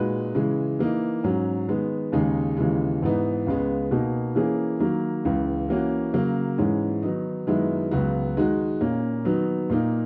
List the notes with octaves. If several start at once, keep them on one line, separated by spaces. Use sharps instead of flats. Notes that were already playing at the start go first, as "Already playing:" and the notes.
Already playing: A#2 G#3 D#4 F#4 B4
C#3 E3 G#3
E3 A#3 D#4
G#2 F#3 C#4
D#3 G#3 B3
D#2 C#3 G#3 D#4 G#4
D#2 C#3 E3 G#3
G#2 E3 B3 D#4
C#2 C#3 G#3 B3
B2 A#3 D#4
E3 A#3 C#4 G#4
D#3 F#3 A#3
C#2 C#3 E3
E3 A#3 C#4 F#4
C#3 F#3 A#3
G#2 E3 G#3 C#4
D#3 F#3 B3 D#4
F#2 D#3 G#3 B3 E4
C#2 C#3 F#3 B3 F#4
D#3 G#3 D#4 F#4
A#2 A#3 C#4
D#3 F#3 B3 D#4
A#2 A#3 D#4